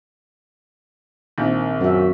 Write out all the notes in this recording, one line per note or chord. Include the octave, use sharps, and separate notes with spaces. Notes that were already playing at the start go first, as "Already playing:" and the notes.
A#1 D#3 C4
F#2 F#4 E5